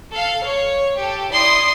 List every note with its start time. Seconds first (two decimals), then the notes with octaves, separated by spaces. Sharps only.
0.13 A4 F5
0.47 C#5
0.99 G4 A4
1.32 E4 D5 C6 D#6